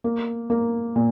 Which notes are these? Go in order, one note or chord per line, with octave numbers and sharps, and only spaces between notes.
A#3
A#3
A#2